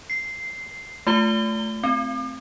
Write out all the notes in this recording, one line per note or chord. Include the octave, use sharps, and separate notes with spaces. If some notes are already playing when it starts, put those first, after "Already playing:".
C7
A3 F4 A#5 G7
C4